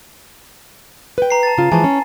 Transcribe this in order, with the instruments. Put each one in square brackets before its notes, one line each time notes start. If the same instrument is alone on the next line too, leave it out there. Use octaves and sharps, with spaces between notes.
[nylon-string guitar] B4 G5
[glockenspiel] A#5 C7
A5 A6
[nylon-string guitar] C#3 F4
[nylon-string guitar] E3 F3 G#3 [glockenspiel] G#5 A5
[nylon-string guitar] C#4